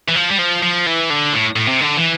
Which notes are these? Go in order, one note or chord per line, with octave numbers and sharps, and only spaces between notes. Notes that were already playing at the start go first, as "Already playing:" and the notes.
E3
F3
G3
F3
F3
E3
D3
A2
A2
C3
D3
E3